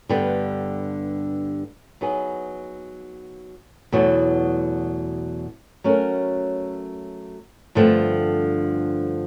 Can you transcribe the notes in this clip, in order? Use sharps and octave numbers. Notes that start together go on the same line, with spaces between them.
G2 D3 G3 B3
F#3 B3 D#4 G#4
E2 B2 F#3 A3
F#3 A3 C#4 F#4 A#4
G2 D3 F3 A3 C4